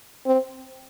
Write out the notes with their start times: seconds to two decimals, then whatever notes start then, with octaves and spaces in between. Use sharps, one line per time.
0.26 C4